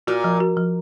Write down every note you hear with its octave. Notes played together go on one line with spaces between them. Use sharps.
A#2 F#4
F3
F#4
F3